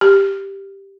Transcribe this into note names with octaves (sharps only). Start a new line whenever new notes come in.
G4